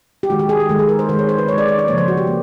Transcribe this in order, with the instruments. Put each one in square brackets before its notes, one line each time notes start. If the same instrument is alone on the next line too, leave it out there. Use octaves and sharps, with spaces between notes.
[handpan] G4
D#3 G#3 F#4
G4
G#4
G4
D#3 G#3 A4
G#4
A#4
C5
D#3 G#3 C5
C#5
C5
B4
D#3 C#5
G#3
D5
D5
D5
A#3 C#5
C#3 F3
C5
F#4
G4
A#3